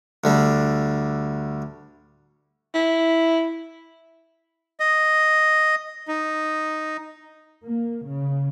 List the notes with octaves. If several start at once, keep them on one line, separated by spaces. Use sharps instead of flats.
D2 D3 G3
E4
D#5
D#4
A#3
C#3